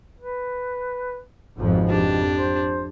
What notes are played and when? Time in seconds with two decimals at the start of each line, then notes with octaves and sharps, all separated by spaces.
0.19 B4
1.59 G#1 F2 B2 F3
1.89 F2 D4 G4
2.35 C5